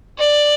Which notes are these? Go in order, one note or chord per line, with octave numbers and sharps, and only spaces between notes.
D5